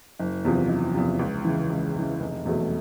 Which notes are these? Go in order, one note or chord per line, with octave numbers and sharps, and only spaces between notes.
F#1
E2 C3 F3
F#1
E2 C3 F3
C#2
C#3 E3
C#2
C#3 E3
F1
E2 B2 F#3 A3